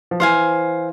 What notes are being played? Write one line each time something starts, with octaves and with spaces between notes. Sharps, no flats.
F3
E3 C5 F5 G#5